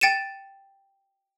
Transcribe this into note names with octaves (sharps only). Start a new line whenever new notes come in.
G5 A6 C#7 D#7 E7